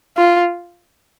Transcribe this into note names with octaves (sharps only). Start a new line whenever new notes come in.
F4